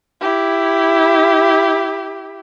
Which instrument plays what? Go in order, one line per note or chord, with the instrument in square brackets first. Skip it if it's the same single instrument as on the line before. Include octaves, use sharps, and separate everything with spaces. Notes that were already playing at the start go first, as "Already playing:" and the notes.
[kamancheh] E4 G4